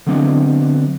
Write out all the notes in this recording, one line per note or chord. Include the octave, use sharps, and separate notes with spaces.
D3 F#3 B3 C4 D4